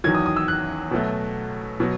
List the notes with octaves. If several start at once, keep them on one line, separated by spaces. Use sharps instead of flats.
E2 D#3 F#3 G#6
D#6
D#6
E6
F#6
B2 F#3 A3
B2 F#3